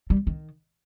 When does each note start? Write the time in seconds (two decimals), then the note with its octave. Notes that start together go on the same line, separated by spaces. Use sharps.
0.10 G3
0.27 D#3